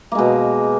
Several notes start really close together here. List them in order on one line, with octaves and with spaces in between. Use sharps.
A#3 G#3 B2